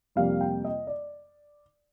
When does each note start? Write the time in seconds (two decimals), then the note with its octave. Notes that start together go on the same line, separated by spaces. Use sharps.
0.16 F2 C3 G3 A#3 F5
0.41 G5
0.65 D#5
0.87 D5